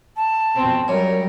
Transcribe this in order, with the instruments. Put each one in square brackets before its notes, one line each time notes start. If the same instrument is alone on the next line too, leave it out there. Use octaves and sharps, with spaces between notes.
[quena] A5
[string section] F2 B2 C4
[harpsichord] F#2 [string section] G3 A#4 [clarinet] C#5